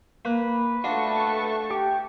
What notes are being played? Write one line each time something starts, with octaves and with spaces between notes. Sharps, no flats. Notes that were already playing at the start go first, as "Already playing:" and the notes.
A#3 B4
A3 D4 F4 F#4 A5 C#6
G4